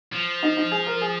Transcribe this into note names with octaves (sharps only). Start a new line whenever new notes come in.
F3
D#4
D#4
G#4
A#4
G#4